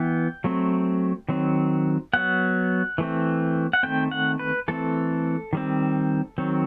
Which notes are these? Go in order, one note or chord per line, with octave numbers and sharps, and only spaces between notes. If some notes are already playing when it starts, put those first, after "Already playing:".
Already playing: E3 B3 G5
F#3 A3 C4
D#3 F#3 C4
F#3 B3 F#5
E3 A3 C4
F#5
D#3 A3 C4 G5
F#5
B4
E3 A3 C4 A4
D#3 G3 C4
D#3 F#3 C4